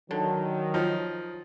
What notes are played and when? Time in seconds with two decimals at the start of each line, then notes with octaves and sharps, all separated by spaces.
0.11 D3 D#3 F#3
0.74 F3 D#4